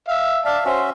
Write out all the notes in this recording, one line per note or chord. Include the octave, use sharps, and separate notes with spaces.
E5 F5
D5 E5 F5 A5
C#4 F#4 C5 E5